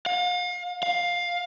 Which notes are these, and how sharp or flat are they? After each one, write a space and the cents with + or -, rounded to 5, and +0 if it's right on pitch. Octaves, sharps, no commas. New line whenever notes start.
F5 +40
F5 +10